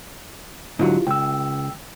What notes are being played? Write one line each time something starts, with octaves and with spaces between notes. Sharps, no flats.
G#2 D3 F#3 E4 F4 G4
C#2 G5 E6